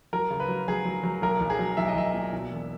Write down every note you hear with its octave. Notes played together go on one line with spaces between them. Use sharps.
F#3 A#4
C#3
B4
F#3
F#3 G#4
F#3
F#3
B1 A#4
B1
G#4
F#3
B1 E5
D#5
B1 E5
A#2
B2
E1